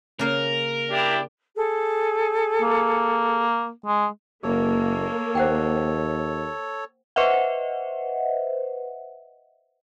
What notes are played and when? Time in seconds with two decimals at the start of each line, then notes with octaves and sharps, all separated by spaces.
0.19 C#3 A#3 A#4 F5
0.90 D4 E4 G4
1.55 G#4 A4
2.62 A#3
3.86 G#3
4.43 F#1 A#3 G#4 A4 C#5
5.35 D#2 C5 F#5 G5
7.16 B4 C5 D#5 E5 F#5